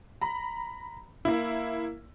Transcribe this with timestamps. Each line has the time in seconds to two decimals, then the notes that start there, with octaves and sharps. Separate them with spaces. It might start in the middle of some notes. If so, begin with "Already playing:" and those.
0.21 A#5 B5
1.25 A#3 E4